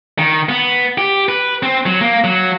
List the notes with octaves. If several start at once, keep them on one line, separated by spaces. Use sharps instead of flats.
D#3
B3
G4
B4
C4
F#3
A#3
F#3